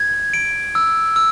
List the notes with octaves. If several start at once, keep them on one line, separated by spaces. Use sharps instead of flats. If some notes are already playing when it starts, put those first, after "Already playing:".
Already playing: G#6
D7
E6
E6